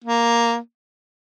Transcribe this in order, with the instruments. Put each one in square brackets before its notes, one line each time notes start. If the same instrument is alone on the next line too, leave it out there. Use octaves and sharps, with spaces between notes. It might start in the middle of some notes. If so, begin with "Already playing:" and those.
[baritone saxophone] A#3